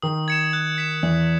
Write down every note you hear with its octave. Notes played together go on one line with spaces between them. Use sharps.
D#3 D#6
G#6 C#7 E7
F#6
B6 E7
E2 E3 D#6